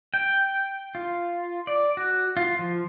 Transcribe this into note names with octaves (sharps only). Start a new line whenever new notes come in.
G5
F4
D5
F#4
F4
F3